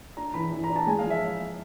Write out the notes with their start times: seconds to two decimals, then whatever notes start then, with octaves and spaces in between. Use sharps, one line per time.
0.17 D4 A#5
0.34 E3 B5
0.52 E3
0.64 A#5
0.70 D4
0.76 A5
0.87 G#3 G#5
0.99 F5
1.04 F3
1.10 E5